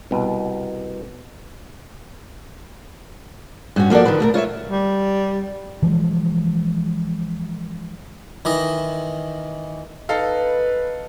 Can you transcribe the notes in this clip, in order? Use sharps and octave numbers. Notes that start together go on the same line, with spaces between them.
C2 B2
G2 C#4 F#4
F3 A#3 F#4 A4 D5
D3 D#3 F3 B4
B2 A3 A#4
F4 C#5 D#5 E5
G3
E3 F3 G#3
D#3 E3 D#5
D#4 A4 B4 F5